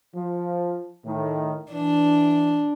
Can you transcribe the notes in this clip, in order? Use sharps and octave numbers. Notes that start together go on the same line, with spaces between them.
F3
A2 D#3
E3 D4